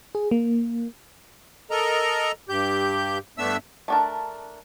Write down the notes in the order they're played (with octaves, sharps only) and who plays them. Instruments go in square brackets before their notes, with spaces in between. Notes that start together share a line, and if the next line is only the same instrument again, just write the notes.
[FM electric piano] G#4
A#3
[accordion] A4 A#4 D#5 A#5
G2 G4 G6
G2 A3 B3 D4 E5 E6
[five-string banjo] A3 D4 A#4